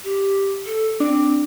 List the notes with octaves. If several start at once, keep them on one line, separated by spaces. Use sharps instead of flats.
G4
A4
C4 D4